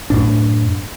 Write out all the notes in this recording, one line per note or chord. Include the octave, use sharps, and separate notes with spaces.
F#2 A2 D4